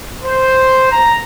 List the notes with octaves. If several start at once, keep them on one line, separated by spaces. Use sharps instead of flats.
C5
A#5